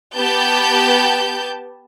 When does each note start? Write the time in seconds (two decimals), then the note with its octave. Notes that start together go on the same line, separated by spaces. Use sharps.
0.15 B3 G4 A5 G6